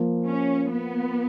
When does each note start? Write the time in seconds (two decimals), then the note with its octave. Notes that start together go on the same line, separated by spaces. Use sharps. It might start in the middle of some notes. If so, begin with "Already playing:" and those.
Already playing: F3 A#3 F4
0.25 C#4
0.71 B3